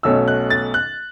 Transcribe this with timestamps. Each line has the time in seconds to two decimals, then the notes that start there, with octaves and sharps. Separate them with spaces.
0.03 B1 B2 A3 C#4 E6
0.28 F#6
0.50 A6
0.74 F#6